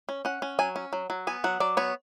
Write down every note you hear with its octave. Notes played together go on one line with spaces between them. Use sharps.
C#4
C#4 F#5
C#4
F#3 G#5
C#4
F#3
F#3
B3 G#5
F#3 F#5
F#3 D5
B3 C#5